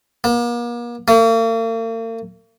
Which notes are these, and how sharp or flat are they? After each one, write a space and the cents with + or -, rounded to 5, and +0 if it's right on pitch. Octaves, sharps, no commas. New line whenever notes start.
A#3 +40
A#3 -45